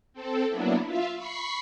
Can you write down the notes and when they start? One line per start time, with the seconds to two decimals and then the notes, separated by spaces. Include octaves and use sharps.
0.13 C4 A4
0.49 F#3 A#3 B3 D4 E4
0.85 F4 E5 F5
1.16 B5 C#6 B6 C7